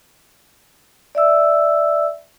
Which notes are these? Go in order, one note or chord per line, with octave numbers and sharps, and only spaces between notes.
D5 E5 E6